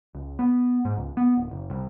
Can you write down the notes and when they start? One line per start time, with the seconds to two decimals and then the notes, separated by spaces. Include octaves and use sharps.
0.15 C#2
0.39 B3
0.85 G#2
0.97 C#2
1.17 B3
1.37 D1
1.51 F#1
1.70 C2